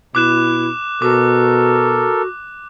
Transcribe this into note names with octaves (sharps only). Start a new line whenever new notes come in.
B2 E4 D6 F#6 E7
B2 F#4 A4 A#4 D6